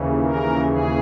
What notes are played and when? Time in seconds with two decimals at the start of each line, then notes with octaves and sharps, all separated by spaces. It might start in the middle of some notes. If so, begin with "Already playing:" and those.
Already playing: D#2 C#3 E3
0.23 A#4
0.66 G#4